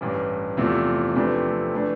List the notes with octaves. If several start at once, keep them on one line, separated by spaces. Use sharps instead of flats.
A1 G2 E3
E2 C3 F3 A3 E4
F2 C3 E3 A3 D4
E3 A3 D4